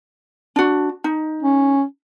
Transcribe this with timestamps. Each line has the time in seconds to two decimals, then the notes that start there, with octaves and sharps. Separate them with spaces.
0.56 D4 F#4
1.04 D#4
1.43 C#4